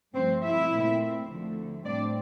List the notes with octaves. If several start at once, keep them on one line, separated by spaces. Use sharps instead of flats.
G2 F3 A3 C4 C5
E4 E5
A#2 A3 C4
D2 D3 F3 A3
A2 G3 C4 D4 D5